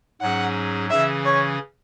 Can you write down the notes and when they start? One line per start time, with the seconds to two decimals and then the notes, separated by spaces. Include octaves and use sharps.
0.21 G#2 F#3 C#4 G#4 F#5
0.90 C#3 E3 C#4 G#4 E5
1.25 C#5